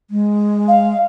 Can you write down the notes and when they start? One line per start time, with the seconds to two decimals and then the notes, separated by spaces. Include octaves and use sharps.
0.10 G#3
0.68 F5